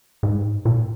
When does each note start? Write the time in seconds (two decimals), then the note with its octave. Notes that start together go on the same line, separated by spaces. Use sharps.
0.23 G#2
0.65 A#2